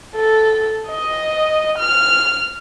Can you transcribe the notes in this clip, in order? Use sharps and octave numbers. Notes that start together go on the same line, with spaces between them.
A4
D#5
F6